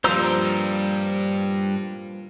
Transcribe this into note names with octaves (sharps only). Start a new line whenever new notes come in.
G2 A#2 F3 G3 C5 A#5 E6